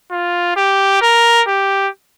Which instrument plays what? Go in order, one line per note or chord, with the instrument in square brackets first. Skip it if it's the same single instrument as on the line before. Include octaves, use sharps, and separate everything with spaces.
[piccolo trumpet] F4
G4
A#4
G4